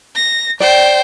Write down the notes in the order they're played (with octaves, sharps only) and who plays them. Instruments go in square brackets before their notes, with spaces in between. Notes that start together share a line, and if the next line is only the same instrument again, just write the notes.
[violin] A#6
[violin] C5 G5 [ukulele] D5